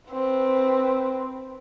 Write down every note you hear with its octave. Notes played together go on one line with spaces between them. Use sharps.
C4 B4